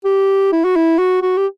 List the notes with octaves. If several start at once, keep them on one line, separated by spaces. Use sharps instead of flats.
G4
E4
F#4
E4
F#4
F#4
G4